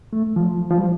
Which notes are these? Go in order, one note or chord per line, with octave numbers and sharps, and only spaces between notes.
A3
F3
F3
G3